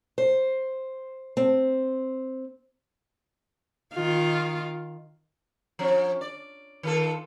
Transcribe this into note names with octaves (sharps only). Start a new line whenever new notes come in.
C5
C4
D#3 F4
F3 C#4
D5
D#3 F4 A4